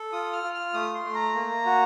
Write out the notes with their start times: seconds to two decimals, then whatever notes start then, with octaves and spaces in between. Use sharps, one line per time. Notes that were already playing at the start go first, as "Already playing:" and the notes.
Already playing: A4
0.13 F4 D#6
0.33 F6
0.43 F4
0.54 F6
0.74 A3 D#6
0.94 C6
1.04 A3
1.14 A#5
1.35 A#3
1.66 F#4